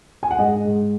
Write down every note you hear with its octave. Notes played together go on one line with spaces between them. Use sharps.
G#5
F#5
G#2 D#5
G#2